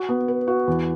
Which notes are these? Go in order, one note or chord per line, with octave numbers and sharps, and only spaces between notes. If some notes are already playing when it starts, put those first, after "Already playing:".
Already playing: F#4
B3
B4
F#4
E2